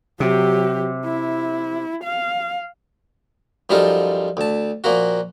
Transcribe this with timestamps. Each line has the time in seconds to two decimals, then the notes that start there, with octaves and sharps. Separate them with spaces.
0.20 C3 F#3 G4
1.05 E4
2.04 F5
3.70 F#2 F3 G3 D#4 F4 A4
4.37 D2 A5
4.84 A#2 F3 A#3 F#4